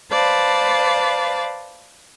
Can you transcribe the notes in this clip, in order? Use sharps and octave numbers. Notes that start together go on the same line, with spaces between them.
B4 C5 D5 F5 A5